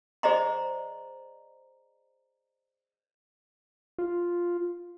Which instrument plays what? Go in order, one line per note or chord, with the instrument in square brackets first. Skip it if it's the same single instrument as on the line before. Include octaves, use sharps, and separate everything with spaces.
[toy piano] G#4 C5 D5 D#5 A#5 C6
[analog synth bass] F4